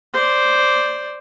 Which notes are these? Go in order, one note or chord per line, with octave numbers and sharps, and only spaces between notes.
C5 D5